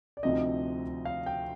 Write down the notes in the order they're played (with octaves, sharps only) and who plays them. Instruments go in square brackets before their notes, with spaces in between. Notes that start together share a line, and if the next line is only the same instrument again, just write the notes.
[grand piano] D5
D2 C3 F3 C4 D#4 D#5
F5
G5